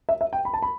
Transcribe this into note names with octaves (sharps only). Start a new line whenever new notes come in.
E5
E5
G5
B5
A5
B5